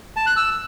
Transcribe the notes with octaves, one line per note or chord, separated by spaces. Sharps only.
A5
F#6
E6